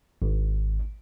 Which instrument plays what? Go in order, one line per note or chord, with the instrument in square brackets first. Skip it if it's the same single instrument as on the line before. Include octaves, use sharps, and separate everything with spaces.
[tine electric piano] G#1